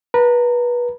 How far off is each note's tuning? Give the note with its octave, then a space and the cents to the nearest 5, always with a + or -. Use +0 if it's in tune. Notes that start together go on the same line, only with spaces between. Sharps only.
B4 -25 A#5 -30